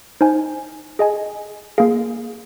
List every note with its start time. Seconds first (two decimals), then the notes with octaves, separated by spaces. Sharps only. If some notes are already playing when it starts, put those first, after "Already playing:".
0.21 D#4 C5 G#5
0.99 G#4 D#5 G#5
1.78 A#3 G#4 F5